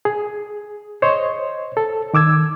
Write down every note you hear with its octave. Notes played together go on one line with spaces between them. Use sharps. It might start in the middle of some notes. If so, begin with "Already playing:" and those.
G#4
C5 C#5 D#5
A4
D#3 D6 E6 G#6